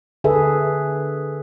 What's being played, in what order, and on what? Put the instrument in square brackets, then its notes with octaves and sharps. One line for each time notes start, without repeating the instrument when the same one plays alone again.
[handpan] D3 G#4 A4 B4 E5